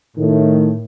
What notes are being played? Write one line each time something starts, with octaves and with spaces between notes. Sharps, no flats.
A2 D#3